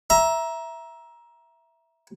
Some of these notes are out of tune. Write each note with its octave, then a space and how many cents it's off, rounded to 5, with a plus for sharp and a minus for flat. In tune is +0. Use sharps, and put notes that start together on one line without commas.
E5 +0 A#5 +20